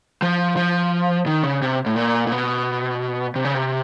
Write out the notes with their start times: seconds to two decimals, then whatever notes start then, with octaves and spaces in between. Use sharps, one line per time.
0.22 F3
0.57 F3
1.26 D#3
1.44 C#3
1.62 C3
1.86 A2
1.96 A#2
2.27 A#2
2.32 B2
3.36 C3
3.45 C#3
3.54 C3